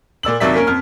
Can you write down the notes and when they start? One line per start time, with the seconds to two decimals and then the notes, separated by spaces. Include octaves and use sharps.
0.23 A#2 D5 E6 F#7
0.40 D#2 C3 F#3 D5 E5 B6
0.55 A#3 C#4 A#4
0.67 F2 F6